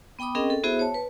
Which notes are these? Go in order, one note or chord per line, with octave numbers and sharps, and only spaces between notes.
B3 G5 B5 D6 D#6
C4 C#4 G#4 A#4 D#5 G5
A4
B3 E4 F#4 G#4 C5 E5
C#5 A5
B4